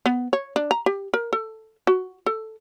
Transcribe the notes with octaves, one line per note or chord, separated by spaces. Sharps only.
B3
C#5
D4
A#5
G4
A#4
A4
F#4
A4